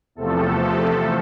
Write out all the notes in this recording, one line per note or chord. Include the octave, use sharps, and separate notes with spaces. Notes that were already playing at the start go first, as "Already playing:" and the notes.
E2 C3 F3 A3 A4